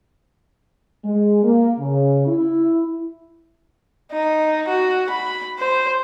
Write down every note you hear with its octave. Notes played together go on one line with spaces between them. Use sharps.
G#3
A#3
C#3
E4
D#4
F#4
B5
C5